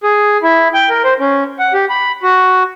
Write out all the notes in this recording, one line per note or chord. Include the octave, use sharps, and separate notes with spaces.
G#4
E4
G5
A#4
C5
C#4
F#5
G4
B5
F#4